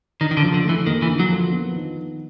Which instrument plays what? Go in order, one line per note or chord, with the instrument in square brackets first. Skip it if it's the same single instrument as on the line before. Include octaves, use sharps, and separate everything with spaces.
[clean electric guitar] D#3 [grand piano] D4
[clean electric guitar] D#3
D3
[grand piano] F3
[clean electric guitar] D3
[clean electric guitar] E3 [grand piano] A3
[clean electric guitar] D#3 [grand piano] A#3
[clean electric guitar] E3
[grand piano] D3
[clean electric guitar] F#3
[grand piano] F3
B3
D#3